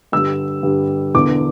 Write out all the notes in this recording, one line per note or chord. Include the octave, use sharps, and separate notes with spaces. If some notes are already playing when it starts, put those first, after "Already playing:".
G2 D3 G3 E6
G2 D3 G3
E1 E2 D3 D6